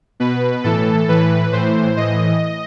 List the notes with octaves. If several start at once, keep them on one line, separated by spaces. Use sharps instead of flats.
B2 B4
A2 E3 A4
A2 E3 B4
A2 E3 C5
A2 E3 D#5